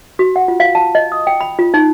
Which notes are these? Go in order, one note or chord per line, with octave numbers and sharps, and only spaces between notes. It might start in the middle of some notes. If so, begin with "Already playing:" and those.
F#4
F#5
F4
F5
A5
D#5
D#6
G5
B5
F4
D#4